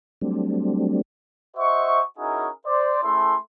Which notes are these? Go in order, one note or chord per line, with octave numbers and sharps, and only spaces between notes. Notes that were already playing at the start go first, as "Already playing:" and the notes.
F#3 G3 A3 C4 D4
F#4 C5 D#5 E5 C#6
C#4 D#4 E4 F#4 G#4 A#4
C5 D5
A3 C#4 E4 G#4 A4 C6